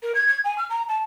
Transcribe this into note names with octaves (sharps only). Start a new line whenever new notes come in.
A#4
G#6
G#6
G#5
F6
A#5
A5